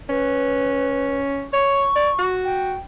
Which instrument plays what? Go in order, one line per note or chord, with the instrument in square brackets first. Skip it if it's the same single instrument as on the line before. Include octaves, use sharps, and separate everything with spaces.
[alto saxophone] C#4 [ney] B4
[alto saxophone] C#5 [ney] C#6
[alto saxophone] D5
F#4
[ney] G5